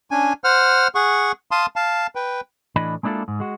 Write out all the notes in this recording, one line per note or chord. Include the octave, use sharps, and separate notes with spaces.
C#4 D4 G#5
C5 F#5 F6
G#4 F#5 C#6
F5 A5 C6 D#6
F5 A5
B4 G5
A2 E3 D4 D#5 B5
G#3 A#3 D4 E4 F4 A4
G#2
G#3 F#4